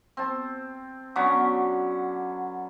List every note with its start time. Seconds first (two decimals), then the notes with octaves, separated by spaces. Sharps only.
0.17 C4 A5
1.16 D3 F#3 B3 C#4